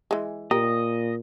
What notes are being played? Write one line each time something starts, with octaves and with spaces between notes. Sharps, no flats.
E3 G#3
A#2 G4 A#4 D#5